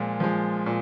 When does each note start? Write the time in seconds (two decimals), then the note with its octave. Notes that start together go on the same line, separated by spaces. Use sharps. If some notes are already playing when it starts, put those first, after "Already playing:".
Already playing: A#2 F3 G#3
0.20 F3 G#3
0.66 A#2